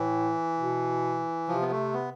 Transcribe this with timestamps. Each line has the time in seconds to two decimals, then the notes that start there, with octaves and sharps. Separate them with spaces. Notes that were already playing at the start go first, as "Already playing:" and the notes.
Already playing: A2 E3
0.58 B2
1.48 C3 F3
1.62 B3
1.71 A3
1.94 B3